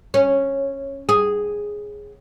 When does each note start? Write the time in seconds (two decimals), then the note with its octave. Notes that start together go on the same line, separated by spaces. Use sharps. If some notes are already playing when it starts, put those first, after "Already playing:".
0.14 C#4
1.09 G#4